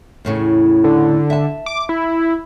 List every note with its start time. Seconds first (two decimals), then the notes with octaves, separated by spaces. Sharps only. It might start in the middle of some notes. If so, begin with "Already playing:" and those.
0.25 E2 A2 C#3
0.84 D3
1.30 E5 A5
1.66 D6
1.89 E4